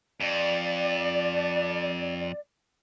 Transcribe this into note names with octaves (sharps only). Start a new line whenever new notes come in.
F2 D5